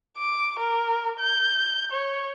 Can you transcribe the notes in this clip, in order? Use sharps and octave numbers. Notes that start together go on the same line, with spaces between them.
D6
A#4
G6
C#5